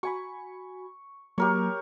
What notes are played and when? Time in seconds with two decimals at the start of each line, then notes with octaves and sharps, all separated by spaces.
0.03 F#4 G#5 B5 C#6
1.38 F#3 A#3 G4 A#4 C#5